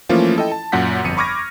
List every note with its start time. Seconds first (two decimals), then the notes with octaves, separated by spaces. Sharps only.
0.09 E3 F3 A3 A#3 C#4 F4
0.36 E4 A4 D#5 G5
0.52 A5
0.72 F#2 A#2 F#5 G6 B6
1.04 G1 F2 C#7 D#7
1.17 B5 C#6 D6 F6 G#6 A#6